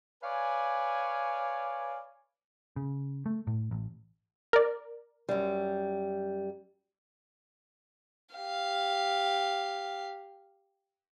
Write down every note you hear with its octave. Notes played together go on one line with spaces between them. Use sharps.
B4 C#5 D5 F5 G#5
C#3
A3
A2
A1
A#4 D5
F#2 G3
G4 F5